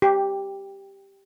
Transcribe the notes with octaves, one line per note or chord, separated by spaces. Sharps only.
G4